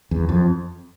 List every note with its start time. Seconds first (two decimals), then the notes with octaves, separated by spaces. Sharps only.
0.11 E2
0.29 F2